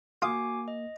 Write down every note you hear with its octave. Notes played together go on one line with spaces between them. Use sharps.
A#3 F4 F#4 G#5 D6 D#6
D#5